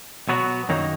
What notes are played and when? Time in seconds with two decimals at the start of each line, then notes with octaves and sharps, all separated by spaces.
0.29 B2 F#3 B3 F#4
0.69 F#2 D#3 F#3 A#3 D#4